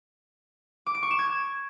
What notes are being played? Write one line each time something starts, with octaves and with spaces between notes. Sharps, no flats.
D6
D7
C#6
E7
G#6